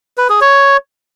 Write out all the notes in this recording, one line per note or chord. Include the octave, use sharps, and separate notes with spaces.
B4
G#4
C#5